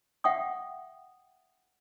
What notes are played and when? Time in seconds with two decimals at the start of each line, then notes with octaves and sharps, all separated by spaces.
0.24 E5 F#5 G5 C#6 D#6